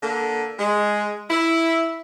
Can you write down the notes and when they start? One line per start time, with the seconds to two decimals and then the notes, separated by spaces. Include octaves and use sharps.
0.02 D3 A#3
0.59 G#3
1.30 E4